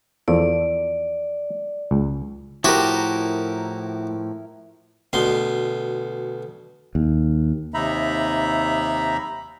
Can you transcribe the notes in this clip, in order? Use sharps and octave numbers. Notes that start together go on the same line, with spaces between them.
E2 F3 A4 D5
C#2
A2 F3 E4 F#4 G4 A#4
D2 B2 C6
D#2
D#2 C3 D#4 E5 A#5 B5